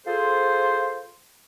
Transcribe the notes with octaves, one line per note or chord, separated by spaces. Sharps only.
F4 G#4 A4 C5